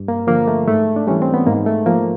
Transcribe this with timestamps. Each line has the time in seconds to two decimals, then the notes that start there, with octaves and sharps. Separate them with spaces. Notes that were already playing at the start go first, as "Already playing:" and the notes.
Already playing: G2
0.08 A#3
0.27 D3 F3 A#3
0.47 A3
0.68 G#2 A3
0.96 D4
1.07 E3 G3 C#4
1.22 C4
1.34 B3
1.47 G#2 A#3
1.66 A3
1.86 F3 A#3